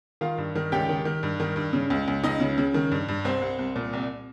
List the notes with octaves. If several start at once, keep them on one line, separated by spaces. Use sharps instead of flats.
D#3 F4 F5
G2
D#3
C#2 G4 G5
D#3
D#3
G2
D#3
G2
C#3
C#2
C#2
C#2 D#4 D#5
C#3
C#3
D#3
G2
G2
C2 C4 C5
C2
C2
A#2
C2